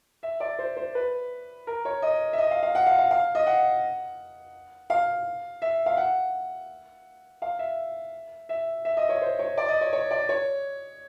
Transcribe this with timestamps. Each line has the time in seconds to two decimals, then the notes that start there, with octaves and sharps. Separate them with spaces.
0.23 E5
0.40 D5
0.59 C5
0.77 C5
0.95 B4
1.67 A#4
1.85 C#5
2.02 D#5
2.33 E5
2.38 D#5
2.51 F5
2.63 F5
2.75 F#5
2.86 F5
2.98 F5
3.11 F5
3.35 D#5
3.46 F#5
4.90 F5
5.62 E5
5.86 F5
5.97 F#5
7.42 F5
7.59 E5
8.49 E5
8.85 E5
8.97 D#5
9.09 C#5
9.22 C5
9.39 C#5
9.57 D5
9.68 D#5
9.81 C#5
9.93 C#5
10.11 D5
10.29 C#5